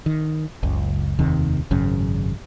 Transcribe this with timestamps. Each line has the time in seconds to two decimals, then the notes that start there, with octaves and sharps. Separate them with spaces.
0.06 D#3
0.63 F#1 C#2
1.19 F1 D#2 C3 D#3
1.71 G#1 F#2 C#3